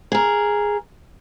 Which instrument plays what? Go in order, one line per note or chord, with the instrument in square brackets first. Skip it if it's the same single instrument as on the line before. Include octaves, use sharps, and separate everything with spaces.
[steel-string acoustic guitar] G#4 A#4